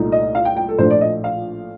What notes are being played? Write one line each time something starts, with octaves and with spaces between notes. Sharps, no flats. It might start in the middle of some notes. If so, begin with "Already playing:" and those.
Already playing: C2 A#2 A3 D#4
D#5
F5
G5
G5
A4
A#1 A2 F3 A3 D4 C5
D5
D#5
F5